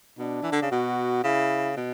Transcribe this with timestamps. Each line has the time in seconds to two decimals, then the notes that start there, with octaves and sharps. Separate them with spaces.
0.18 B2 D4
0.43 E3
0.52 D3
0.62 C#3
0.71 B2 F#4
1.24 C#3 E4
1.77 B2